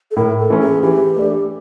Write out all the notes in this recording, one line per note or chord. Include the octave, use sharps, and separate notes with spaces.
A4
A2 A#4
A4
E3 A3 C#4
G#4
E3 G4
A3 D4